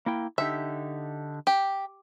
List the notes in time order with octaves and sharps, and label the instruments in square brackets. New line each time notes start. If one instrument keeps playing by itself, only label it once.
[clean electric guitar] A#3 E4 G5
[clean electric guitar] D3 D#4 G4 [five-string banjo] E5
[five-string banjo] G4